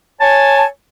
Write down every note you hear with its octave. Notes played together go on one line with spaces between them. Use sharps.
C#5 G#5 A5